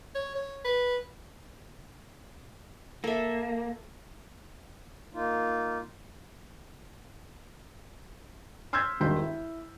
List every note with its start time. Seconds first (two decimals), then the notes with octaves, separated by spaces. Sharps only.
0.15 C#5
0.35 C#5
0.64 B4
3.04 A#3 A4 E5
5.14 A#3 D#4 F4
8.73 C6 E6 F6 G6 G#6 B6
9.00 E1 G2 D#3 C6 G6 B6
9.22 E4